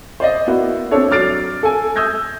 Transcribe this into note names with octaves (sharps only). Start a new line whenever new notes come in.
C5 D5 D#5
A#3 B3 E4 F#4
C4 D4 A4 C#5
F#3 D6 F6 A6 C7 D7
A4 G#5
D#6 E6 G6 G#6 A#6